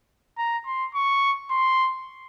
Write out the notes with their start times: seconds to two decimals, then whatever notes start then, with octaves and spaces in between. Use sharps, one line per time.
0.38 A#5
0.66 C6
0.94 C#6
1.51 C6